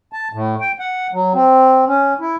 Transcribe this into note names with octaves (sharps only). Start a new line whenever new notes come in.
A5
A2
G5
F#5
F#3
C4
C#4
E4